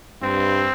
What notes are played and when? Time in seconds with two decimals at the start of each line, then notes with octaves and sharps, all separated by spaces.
0.22 G2 C4